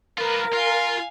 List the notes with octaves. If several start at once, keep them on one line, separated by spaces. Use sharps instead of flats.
F4 A#4 B4
F4 F5 G#5